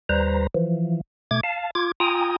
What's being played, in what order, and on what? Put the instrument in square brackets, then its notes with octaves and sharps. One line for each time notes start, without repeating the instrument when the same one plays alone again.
[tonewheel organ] D#2 G3 B4 C5 A#5
E3 F3
B2 A3 D6 G#6
F5 A5
F4 D6 G#6
F4 G5 G#5 A#5 D#6